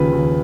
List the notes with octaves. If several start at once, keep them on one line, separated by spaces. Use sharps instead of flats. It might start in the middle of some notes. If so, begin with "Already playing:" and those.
Already playing: D#2 C#3 F3 B4
D#2